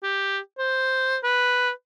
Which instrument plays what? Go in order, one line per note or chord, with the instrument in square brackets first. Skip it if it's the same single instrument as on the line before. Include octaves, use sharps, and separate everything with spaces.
[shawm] G4
C5
B4